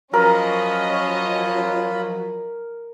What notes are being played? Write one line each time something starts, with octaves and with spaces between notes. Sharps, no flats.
F3 F#3 C#4 F4 A#4 D#5 B5